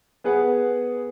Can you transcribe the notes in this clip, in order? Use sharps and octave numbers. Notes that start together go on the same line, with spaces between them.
B3 G#4 B4 F#5